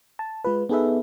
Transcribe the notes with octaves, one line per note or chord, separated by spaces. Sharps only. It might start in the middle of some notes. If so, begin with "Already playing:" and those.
A5
G#3 F4 B4
B3 D#4 G#4 A4 B4 E5